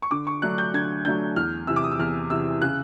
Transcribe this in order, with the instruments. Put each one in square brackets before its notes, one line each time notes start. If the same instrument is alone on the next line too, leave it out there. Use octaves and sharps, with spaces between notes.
[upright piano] C#6
D3 D6
C#6
F#3 A3 D4 F#6
G6
D3 G#6
F#3 A3 D4 G6
E2 F6
C3 E3 E6
D6
D#6
E6
E2 F6
C3 E3 E6
C#3 F#6